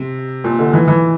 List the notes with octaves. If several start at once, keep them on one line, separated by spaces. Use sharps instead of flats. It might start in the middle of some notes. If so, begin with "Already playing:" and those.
Already playing: C3
A#2
D3
E3
E3